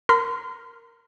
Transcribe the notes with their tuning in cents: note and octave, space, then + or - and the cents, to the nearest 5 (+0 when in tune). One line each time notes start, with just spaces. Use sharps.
A#4 +0 C6 -40